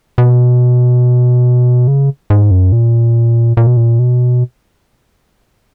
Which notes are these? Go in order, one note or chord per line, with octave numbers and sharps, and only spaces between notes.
B2
C#3
G#2
F#2
A#2
A#2
B2
A#2
B2